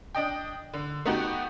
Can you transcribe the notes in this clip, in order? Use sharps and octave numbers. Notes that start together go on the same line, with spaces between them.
D4 D#5 G5
D3
A3 B3 D#4 F#4 G4